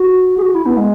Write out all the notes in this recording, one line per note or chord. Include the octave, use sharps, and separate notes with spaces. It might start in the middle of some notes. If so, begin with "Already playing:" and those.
Already playing: F#4
G#4
F#4
E4
B3
G#3